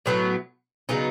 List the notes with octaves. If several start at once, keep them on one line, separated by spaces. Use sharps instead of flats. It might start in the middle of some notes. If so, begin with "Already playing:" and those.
A2 F#3 B3
C#3 F#3 B3 D#4